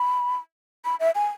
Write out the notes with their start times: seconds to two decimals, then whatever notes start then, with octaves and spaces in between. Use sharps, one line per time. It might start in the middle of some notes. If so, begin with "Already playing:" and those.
Already playing: B5
0.85 B5
1.00 E5
1.15 G#5